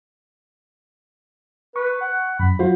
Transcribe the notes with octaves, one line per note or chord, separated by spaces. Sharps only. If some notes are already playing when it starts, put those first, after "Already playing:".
B4 C#6
F#5
F#2 B5
F#3 F4 F#4 C5